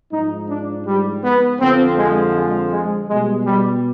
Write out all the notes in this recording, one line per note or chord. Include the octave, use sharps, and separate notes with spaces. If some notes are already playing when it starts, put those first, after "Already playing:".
G#2 F3 D#4
D4
G3
B3
F2 D3 F3 C4
G#3
G#3
G#3
B2 G3 G#3
G3